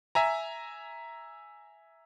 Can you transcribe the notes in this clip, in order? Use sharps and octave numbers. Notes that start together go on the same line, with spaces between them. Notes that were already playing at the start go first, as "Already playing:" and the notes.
E5 G#5 A#5